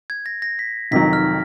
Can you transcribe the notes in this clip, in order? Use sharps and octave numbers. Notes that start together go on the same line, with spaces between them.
G#6
A#6
A#6
B6
F1 F2 D#3 F#3 B6
F6